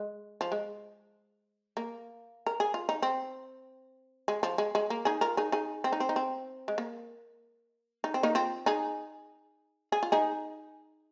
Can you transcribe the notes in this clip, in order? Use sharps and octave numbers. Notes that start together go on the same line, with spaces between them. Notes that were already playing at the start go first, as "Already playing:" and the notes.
Already playing: G#3
F3
G#3
A#3
A#4
G#4
F4
D#4
C4
G#3
F3
G#3
G#3
A#3
D#4 G#4
F4 A#4
D#4 G#4
D#4 G#4
C4
D#4
C4
D#4
C4
G#3
A#3
D#4
C4
A#3 D#4
C4 F4
D#4 G#4
G#4
F4
D#4 G#4